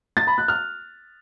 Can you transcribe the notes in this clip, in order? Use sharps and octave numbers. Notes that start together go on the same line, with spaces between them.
A6
B5
F#6
F6